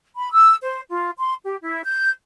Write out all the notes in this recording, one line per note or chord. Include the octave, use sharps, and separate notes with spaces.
B5
E6
C5
F4
C6
G4
E4
G6